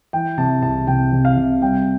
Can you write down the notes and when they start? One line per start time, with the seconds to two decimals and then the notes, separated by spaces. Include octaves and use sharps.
0.13 E3 G5
0.38 C3 A5
0.62 C2 A5
0.87 C3 G5
1.12 C3
1.25 F5
1.37 C3
1.62 G3 G5